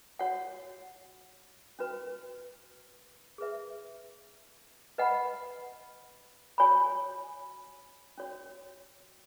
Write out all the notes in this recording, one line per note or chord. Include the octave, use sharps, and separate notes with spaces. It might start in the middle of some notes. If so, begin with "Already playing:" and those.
F#4 C#5 F#5
C#4 F#4 B4
G#4 B4 E5
B4 D#5 F#5 B5
F#4 C#5 G#5 B5
C#4 F#4 C#5